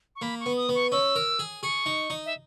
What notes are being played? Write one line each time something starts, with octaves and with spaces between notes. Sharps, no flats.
C#6
A#3 B5
C#6
B3
D#6
B3
C#6
C#4 E6
A#4
G#4
G#4 C#6
D#4
D#4
E5